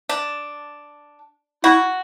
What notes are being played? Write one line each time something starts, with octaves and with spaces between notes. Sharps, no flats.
D4
E4 F#4